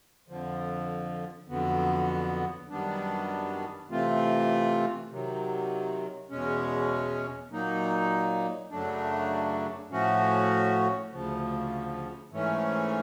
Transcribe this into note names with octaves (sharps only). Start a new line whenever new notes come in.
F2 D3 F3
F2 D3 F#3 B3
F#2 D#3 G3 B3 D4
C3 E3 A3 C4 F4
C3 D#3 F#3
E2 B2 G#3 C#4
A#2 F#3 A#3 D#4
F#2 C#3 F#3 A3 D4
A2 F3 A3 C#4 F#4
D2 C#3 F3
G#2 E3 A3 C#4